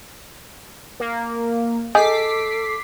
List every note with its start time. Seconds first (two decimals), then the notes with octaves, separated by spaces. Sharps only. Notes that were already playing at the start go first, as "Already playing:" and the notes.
1.00 A#3
1.95 G#4 A4 D#5 D6 G6 B6 C7